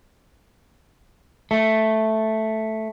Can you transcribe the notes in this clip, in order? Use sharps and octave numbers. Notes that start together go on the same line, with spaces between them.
A3